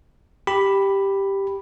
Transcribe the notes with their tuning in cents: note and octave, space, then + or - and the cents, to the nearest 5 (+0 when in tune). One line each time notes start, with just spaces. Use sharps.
G4 +0 B5 +0